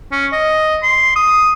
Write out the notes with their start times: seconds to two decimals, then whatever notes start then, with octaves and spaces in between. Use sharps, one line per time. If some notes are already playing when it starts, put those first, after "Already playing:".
0.12 C#4
0.33 D#5
0.83 C6
1.16 D#6